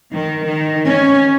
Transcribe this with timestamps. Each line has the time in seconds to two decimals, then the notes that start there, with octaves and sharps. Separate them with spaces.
0.13 D#3
0.46 D#3
0.86 C#4